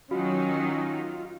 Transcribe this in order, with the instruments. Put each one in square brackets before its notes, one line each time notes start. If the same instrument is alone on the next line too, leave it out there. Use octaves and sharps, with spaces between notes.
[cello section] D#3 F#3 D#4 [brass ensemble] C#4 [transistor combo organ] F4 [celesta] F#4